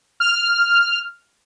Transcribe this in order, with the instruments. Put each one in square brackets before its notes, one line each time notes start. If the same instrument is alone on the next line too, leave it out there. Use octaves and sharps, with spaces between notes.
[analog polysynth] F6